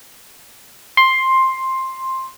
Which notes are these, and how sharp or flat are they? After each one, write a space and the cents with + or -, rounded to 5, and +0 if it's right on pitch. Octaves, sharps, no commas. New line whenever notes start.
C6 +10